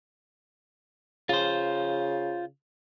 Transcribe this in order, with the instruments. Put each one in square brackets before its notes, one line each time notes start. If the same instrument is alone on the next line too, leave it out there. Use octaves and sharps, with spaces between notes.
[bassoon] C#3 [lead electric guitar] F4 C5